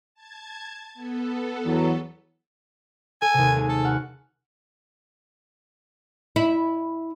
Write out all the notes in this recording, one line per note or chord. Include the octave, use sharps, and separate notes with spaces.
A5 G#6
B3 A4
E2 F#3
A4 G#5
D#2 C3
G#3 G#5
A4
F#4 F#5 F6
E4